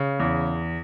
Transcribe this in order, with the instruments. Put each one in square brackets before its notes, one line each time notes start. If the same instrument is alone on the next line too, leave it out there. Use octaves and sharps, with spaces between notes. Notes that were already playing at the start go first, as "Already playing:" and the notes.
Already playing: [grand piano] C#3
E2